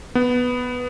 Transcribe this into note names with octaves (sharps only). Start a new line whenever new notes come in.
B3